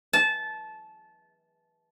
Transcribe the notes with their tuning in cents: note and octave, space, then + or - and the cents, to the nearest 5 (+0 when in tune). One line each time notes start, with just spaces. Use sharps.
A5 -20